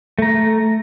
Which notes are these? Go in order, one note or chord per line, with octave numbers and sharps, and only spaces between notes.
A3 A#5